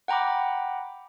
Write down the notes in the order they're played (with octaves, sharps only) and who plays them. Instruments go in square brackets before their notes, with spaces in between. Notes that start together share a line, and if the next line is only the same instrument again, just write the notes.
[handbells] F#5 G5 A#5 B5 D6